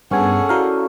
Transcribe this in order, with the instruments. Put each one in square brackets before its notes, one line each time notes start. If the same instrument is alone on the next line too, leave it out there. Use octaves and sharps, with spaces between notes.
[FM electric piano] G2 B3 G#5 [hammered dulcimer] C#4 A4 [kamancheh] G#4 F#5
[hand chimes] E4 F#4 D5 [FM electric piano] A#4 F5